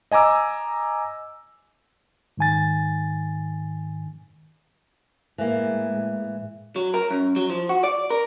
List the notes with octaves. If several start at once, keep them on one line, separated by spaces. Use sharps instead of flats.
D#5 G#5 A#5 D6 E6
G#2 D#3 G#5 A6
A2 E3 G#3 A#3
F#3
A#4
F#2
F#3
F3
F#4
D5
A#4